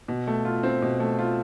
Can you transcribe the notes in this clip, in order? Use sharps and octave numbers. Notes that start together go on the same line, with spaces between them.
B2
A3
F4
C4
B2
A3
F4